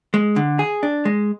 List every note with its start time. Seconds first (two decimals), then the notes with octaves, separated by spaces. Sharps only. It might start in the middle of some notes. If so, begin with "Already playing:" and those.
0.14 G#3
0.36 D3
0.59 G#4
0.83 D4
1.05 G#3